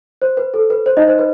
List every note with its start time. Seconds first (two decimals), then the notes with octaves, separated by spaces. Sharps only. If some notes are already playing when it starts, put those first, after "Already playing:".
0.22 C5
0.37 B4
0.54 A4
0.70 B4
0.86 C5
0.97 D#4 D#5
1.08 C5
1.19 B4